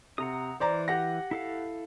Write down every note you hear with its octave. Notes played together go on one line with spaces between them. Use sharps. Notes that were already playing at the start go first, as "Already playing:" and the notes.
C3 F#5 A#5 D#6
E3 C5 D5 A#5
G4 F#5 A#6
E4 A4 F5